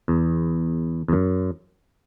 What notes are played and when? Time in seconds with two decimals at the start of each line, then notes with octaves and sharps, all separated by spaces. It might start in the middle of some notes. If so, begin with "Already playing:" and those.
0.08 E2
1.08 E2
1.13 F#2